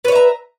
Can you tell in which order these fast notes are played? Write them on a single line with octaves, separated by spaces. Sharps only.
B4 C#5 E5 A#5